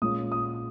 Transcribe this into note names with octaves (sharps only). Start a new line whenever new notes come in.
A#2 G#3 C#4 D#6
D#6